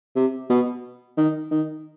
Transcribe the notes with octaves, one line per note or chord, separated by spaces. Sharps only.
C3
B2
D#3
D#3